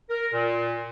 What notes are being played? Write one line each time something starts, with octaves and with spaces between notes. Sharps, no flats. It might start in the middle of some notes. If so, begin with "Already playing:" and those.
A#4
A#2